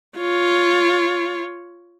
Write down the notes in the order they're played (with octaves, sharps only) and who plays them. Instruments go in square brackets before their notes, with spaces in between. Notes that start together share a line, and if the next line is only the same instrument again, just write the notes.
[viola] F4 C#5